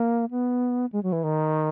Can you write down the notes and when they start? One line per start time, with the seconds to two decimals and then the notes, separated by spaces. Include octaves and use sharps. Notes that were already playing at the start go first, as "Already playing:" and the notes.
Already playing: A#3
0.31 B3
0.92 G#3
1.03 F#3
1.12 E3
1.24 D#3